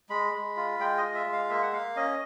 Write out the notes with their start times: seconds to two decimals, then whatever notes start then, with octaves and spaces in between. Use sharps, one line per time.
0.10 G#3 B5
0.33 G#3
0.57 F4
0.79 G#3 G5
0.98 D#5
1.03 F4
1.14 E5
1.27 G#3
1.32 F5
1.49 A#3 E5
1.62 F#5
1.73 A#3 F5
1.96 C#4 D#5